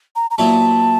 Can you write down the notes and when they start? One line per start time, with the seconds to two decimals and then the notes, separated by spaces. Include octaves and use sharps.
0.16 A#5
0.31 A#5
0.38 A#2 F#3 B3 E4 A5